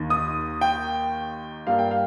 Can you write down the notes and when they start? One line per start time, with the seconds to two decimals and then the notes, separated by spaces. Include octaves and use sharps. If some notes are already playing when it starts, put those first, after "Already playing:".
Already playing: D#2 D#3 A#3
0.10 D#6
0.61 G5
1.67 G2 G3 A#3 F5
1.79 G5
1.91 F5